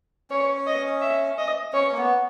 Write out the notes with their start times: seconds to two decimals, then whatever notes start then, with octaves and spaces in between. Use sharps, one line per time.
0.31 C#4 C#5
0.67 D#5
1.02 E5
1.38 D#5
1.73 C#4 C#5
1.92 A#3
1.97 B3